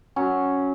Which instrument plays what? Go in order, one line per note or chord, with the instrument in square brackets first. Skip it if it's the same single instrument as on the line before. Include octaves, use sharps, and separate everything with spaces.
[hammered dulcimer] F#3 C#4